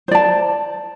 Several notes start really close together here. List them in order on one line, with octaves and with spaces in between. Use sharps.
C5 D5 A5